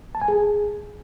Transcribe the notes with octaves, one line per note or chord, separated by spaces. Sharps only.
A5
G#5
G#4